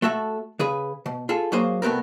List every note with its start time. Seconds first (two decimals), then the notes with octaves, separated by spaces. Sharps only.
0.02 A3 F#4 A4 E5
0.59 C#3 G#4 B4
1.06 B2
1.29 F4 G#4 A4
1.52 F#3 A#3 F#4 G#4 C5 F5
1.82 C2 A3 B3 C4 A#4